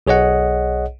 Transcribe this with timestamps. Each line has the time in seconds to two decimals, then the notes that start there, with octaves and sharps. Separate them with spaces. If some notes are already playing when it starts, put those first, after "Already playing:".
0.07 B1 G#4 C#5 D#5 F#5